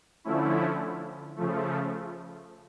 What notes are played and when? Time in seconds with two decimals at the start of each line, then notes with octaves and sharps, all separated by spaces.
0.24 D3 F3 A3 C#4 E4
1.36 C#3 F3 A3